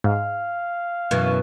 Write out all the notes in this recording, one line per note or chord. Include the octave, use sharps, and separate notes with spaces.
G#2 F5
F#2 B2 E3